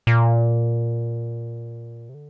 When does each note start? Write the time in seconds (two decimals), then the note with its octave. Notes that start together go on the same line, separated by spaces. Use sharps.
0.07 A#2
2.09 C3
2.14 D3